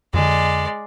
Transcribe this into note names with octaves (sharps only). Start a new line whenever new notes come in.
F2 D3 G#3 D5